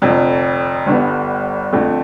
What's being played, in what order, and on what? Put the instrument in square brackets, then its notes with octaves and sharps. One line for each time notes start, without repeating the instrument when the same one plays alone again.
[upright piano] F1 F2 D3
G1 G2 D3 G3 B3
F2 D3 A3